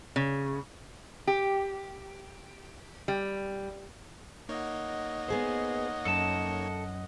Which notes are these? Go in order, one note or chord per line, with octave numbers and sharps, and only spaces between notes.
C#3
G4
G3
A#3 D#4 C#5 D#5 F#5
B3 G#4 C5
F#2 A4 A5